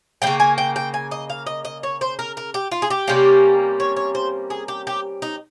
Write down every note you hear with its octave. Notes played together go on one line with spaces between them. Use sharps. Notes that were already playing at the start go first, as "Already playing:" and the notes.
G3 A#3 G5
C#3
G#5
G5
G5
G#5
D#5
F5
D#5
D#5
C#5
C5
A#4
A#4
G4
F4
G#4
G4
C3 G3 A#3 C#4
C#5
C#5
C5
G#4
G4
G4
D#4